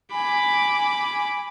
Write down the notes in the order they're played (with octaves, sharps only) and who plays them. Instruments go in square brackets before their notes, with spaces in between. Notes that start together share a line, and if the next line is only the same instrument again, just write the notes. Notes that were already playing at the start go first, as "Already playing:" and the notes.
[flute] G#5 [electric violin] B5 D6